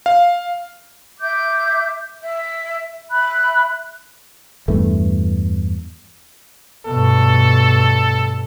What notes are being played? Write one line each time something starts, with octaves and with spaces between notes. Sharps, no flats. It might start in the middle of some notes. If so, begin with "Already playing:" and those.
F5
E5 D6 G6
E5
E5 B5 F#6
E2 G2 E3 A3
G2 B2 A4